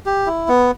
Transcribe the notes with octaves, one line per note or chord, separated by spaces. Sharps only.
G4
E4
B3